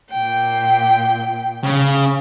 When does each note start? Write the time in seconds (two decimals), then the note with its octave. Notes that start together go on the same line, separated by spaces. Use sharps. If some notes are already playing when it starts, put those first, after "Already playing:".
0.10 A#2 G5
1.64 C#3